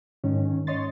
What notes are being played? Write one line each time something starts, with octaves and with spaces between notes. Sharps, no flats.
G#2 D#3 C#4
C#5 D#5 C6 A6